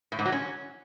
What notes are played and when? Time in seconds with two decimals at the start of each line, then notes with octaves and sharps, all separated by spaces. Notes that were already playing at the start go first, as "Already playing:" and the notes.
0.12 A2
0.19 G#2
0.25 F#3
0.32 C#4